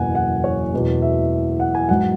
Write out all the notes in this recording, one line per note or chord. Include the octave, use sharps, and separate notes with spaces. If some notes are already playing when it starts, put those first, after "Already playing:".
Already playing: F#1 E2 B2 F#3 F#5 G#5
F#5
C#5
E1 E2 B2 F#3
E5
F#5
G#5
G#2 F#3 F#5